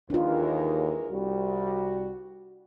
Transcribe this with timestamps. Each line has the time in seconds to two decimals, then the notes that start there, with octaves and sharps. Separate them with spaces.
0.10 D#2 E3 G#3 D4 F4 A#4
1.10 C2 G3 F#4